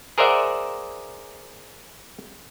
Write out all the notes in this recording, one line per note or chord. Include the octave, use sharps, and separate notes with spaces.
G#4 A#4 C5 D5 E5 F#5